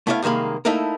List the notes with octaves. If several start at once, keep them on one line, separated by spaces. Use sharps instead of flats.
A3 B3 E4 A4 C5 F5
C2 D#3 G#3 A#3 B5
A3 A#3 D#4 E4 A4 A#4